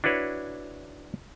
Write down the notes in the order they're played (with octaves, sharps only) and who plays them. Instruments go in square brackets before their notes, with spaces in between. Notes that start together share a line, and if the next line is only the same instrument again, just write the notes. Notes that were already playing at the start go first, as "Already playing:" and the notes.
[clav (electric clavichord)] D4 E4 F#4 B4 C#5